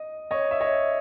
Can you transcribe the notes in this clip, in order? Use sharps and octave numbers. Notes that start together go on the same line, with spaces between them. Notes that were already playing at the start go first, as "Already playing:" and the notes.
Already playing: D#5
C#5 D#5
E5
C#5 D#5